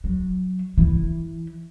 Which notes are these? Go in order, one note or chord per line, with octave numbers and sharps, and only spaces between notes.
F#3
E3